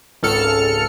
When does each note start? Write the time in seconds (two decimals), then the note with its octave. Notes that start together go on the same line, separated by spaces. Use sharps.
0.23 G#1 C#2 A4 F6 C#7